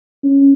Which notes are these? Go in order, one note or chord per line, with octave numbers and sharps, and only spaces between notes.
C#4